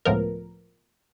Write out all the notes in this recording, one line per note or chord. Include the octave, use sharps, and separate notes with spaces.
C#2 A2 F3 B3 A#4